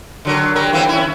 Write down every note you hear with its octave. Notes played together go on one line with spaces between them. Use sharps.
D3 F#3 A#4
F#3 G3 A#4
E3 A#3 C4
C#4 E4